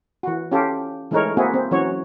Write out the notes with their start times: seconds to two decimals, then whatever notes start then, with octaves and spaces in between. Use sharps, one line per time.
0.23 E3 F#4
0.52 C#4 F4 G4 A4
1.11 E3 G#3 A3 D#4 A#4 C#5
1.37 A#3 C4 E4 F#4 G#4
1.54 C4
1.71 E3 F#3 C#4 F#4 C#5